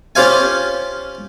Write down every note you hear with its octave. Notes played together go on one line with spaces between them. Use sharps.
C#4 F4 G4 C5 F5 G#5